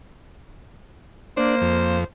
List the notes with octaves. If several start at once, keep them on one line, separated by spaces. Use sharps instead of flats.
A#3 D4 C5
F2